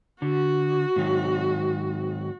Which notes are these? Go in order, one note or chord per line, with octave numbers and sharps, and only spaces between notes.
D3 F#4
G#2 D#3 F#3